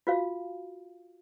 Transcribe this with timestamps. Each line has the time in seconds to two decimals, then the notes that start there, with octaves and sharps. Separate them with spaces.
0.07 F4 F#4 F5